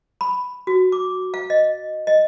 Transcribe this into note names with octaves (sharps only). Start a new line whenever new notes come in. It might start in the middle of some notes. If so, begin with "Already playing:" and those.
B5
F#4
D6
F5
D#5
D#5